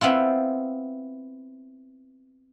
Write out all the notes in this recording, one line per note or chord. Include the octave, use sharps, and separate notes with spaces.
B3 C4 E4 F4